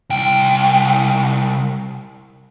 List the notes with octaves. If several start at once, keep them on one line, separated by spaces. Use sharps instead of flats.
C2 G5